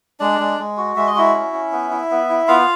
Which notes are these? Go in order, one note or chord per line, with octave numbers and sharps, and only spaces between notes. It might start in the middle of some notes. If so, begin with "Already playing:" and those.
G#3 D4 D5
G#3
G#3
F#4
G#3 E5
D#5
E4 F#4 E5
C#4
C#4
B3
E4
B3
E4
B3 F4 F5